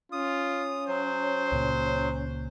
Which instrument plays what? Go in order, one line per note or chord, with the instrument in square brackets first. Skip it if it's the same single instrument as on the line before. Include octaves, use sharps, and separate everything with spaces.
[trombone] C#4 [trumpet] F4 [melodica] D#6
[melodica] F#3 [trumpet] C5
[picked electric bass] C#2 A#2